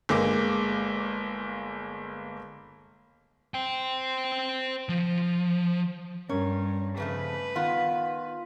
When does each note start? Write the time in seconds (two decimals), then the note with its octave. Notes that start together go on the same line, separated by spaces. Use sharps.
0.09 G1 G#3 A#3 D6
3.54 C5 G5
4.89 F3
6.29 G2 C#4 A#4 C#5
6.97 F2 C#3 A3 B4
7.56 D#3 B3 F4